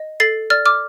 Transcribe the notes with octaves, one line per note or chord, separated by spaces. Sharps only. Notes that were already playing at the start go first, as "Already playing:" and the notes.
Already playing: D#5
A4 A6 C7
D5 F6 A6
D6 F6